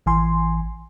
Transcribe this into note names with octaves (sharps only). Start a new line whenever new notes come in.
A1 E3 G#5 C6